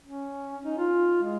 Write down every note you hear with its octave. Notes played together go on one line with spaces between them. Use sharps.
C#4
D#4
F4
G#3